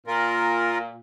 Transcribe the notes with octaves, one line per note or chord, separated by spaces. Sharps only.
A#2 F4 A#4